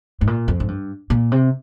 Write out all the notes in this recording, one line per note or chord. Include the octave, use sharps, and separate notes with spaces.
G#2
A#2
F2
G#2
G2
A#2
C3